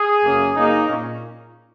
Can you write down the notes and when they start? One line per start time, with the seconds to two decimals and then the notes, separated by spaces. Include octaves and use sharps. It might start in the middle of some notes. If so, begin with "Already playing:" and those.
Already playing: G#4
0.25 F#2 C#3 A#3 C#4
0.56 F#2 C#3 A#3 D#4
0.88 A#2 C#4